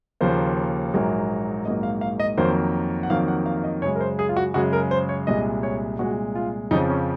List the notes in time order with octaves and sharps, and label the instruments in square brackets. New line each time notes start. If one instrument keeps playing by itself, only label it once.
[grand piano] D#2 C#3 F3 A#3 C5
A#1 G#2 F#3 A#3
A#1 G#2 F#3 A#3 D#5
F5
F5
D#5
F2 D#3 F#3 A#3 C5
F#5
F2 D#3 F#3 A#3 F5
F#5
F5
F5
D#5
F#2 C#3 G#3 C#5
A#4
C5
G#4
F4
F#4
F#2 C#3 G#3 F#4
A#4
C5
C#5
C2 A#2 G#3 D#5
C#5
C2 A#2 G#3 F#4
F4
F2 C#3 F3 D#4
C#4